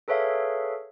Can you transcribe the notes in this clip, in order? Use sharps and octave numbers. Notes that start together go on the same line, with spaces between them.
G#4 A4 B4 C#5 E5 F5